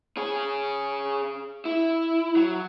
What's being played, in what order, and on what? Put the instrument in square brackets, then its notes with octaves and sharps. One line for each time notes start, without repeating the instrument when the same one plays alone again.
[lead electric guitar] C#4 G#4
E4
F#3